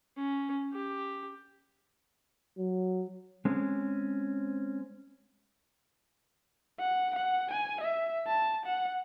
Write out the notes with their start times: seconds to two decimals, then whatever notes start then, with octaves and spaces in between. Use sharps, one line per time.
0.16 C#4
0.73 G4
2.58 F#3
3.45 G#3 C4 C#4
6.80 F#5
7.16 F#5
7.51 G#5
7.81 E5
8.27 A5
8.66 F#5